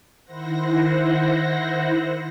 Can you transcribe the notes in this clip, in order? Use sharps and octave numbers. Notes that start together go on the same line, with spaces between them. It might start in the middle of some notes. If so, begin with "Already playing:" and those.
D#3 E4 C5 F#5 A#6